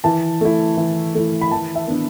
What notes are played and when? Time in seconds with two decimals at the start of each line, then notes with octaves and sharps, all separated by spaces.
0.04 E3 A5
0.41 A3 E4
0.77 E3
1.15 A3 E4
1.41 B5
1.51 E3 A5
1.75 E5
1.88 B3 D4